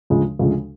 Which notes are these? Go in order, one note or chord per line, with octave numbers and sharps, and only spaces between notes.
D2 C#3 F3 G#3
D2 C#3 F3 G#3